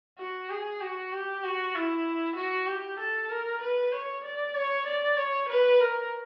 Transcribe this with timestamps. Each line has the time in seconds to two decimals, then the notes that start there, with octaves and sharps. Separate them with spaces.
0.18 F#4
0.50 G#4
0.81 F#4
1.12 G4
1.44 F#4
1.75 E4
2.36 F#4
2.67 G4
2.99 A4
3.30 A#4
3.61 B4
3.92 C#5
4.24 D5
4.55 C#5
4.87 D5
5.17 C#5
5.49 B4
5.80 A#4